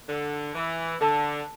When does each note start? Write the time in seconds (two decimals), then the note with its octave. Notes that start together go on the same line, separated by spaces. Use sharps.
0.09 D3
0.55 E3
1.01 D3 A4 D5 A5